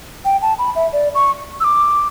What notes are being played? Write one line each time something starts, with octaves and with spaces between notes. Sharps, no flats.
G5
A5
B5
E5
D5
C#6
E6
D6